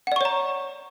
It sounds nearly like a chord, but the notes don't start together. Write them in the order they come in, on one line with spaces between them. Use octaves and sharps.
F#5 D5 C#6 C#5 A#5